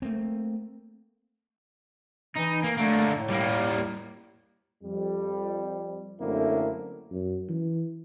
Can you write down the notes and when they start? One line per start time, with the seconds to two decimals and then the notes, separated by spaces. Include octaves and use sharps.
0.02 A3 A#3 C4
2.36 E3 D#4
2.63 A#3
2.77 D3 A3 A#3
3.13 A2
3.30 G3 A#3
4.83 F2 G3
6.21 F#2 D3 A3 A#3 C4 E4
7.11 F#2
7.49 E3